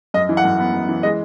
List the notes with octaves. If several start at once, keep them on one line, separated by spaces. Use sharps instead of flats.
F#2 D#5
E3
F#5
F#2
B3
F#2
E3
G#3 D#5